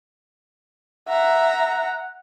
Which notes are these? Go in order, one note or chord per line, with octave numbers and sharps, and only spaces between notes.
E5 F#5 A#5